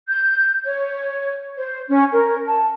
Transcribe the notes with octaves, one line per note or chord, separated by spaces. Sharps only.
G6
C#5
C5
C#4
A#4
A5